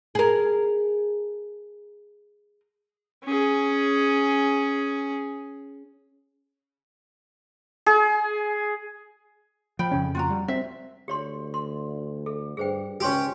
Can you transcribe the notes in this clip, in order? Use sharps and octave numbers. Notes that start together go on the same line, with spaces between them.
G#4 A#4
C#4 G#4
G#4
F3 G5 B5
F2 C#3 C#4
F4 F#4 A#5
G3
C4 E5
D2 G4 C#5 C6
C6
A4
G2 G#4 C5 G5
C#2 C#4 G4 G#5 C6 C#6